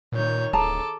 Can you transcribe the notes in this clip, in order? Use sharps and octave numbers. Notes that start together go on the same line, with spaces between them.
A#2 D#3 C#5 G6
D1 G#4 A4 A5 A#5 D6